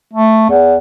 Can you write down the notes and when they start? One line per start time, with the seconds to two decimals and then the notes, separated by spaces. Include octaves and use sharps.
0.13 A3
0.49 E2